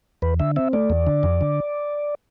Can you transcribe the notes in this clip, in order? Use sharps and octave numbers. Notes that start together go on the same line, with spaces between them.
E2 B4
D3 E5
C4 E5
A3 D5
E2
D3
F2
D3